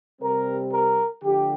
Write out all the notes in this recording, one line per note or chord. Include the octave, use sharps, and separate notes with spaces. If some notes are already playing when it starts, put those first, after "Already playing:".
C3 G3 C4 A#4
A#4
D3 F3 A3 G4